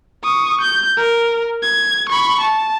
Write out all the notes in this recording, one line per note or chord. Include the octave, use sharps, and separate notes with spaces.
C#6 D#6
G6
A#4
G#6
B5 C#6
A5